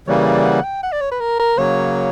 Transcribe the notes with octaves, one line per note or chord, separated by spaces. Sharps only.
C#3 E3 G3 A#3 C#5
D5
F#5
G5
F#5
D5
C#5
B4
A#4
A#4
C#3 F#3 A#3 C#5